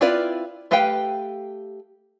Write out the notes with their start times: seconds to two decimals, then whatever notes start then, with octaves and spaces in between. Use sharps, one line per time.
0.01 C4 E4 F4 B4 D5
0.71 A3 G4 B4 F5 G5